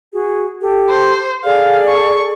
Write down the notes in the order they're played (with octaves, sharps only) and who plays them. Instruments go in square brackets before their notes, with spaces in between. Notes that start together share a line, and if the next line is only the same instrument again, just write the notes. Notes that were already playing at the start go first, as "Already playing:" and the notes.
[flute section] F#4 G#4
G4 A4
[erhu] C5
[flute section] G#4 A4 D5 [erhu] F5
[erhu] C#6